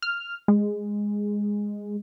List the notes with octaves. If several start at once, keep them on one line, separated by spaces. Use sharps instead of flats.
F6
G#3